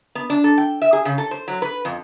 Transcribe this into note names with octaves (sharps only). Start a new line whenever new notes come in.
B3
D4
A4
G5
E5
G#4
C#3
A4
C5
F#3
B4
F2